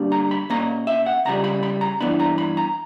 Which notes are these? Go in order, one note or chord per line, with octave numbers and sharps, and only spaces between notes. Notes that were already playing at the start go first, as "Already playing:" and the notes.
Already playing: D2 G3 A#3 D4
A#5
B5
A#2 A#3 C#4 A#5
E5
F#5
C#2 C#3 G3 A#5
B5
B5
A#5
G2 E3 B3 D4 B5
A#5
B5
A#5